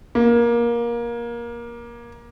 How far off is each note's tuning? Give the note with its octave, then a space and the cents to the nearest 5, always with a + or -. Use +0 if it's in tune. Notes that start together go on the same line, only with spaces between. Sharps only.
A#3 +20